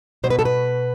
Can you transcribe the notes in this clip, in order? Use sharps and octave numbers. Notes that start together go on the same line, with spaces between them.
B2 C5
B4
A4
B4